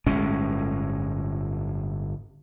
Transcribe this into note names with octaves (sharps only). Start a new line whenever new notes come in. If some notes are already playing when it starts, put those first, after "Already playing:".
G1 A2 G#3 C#4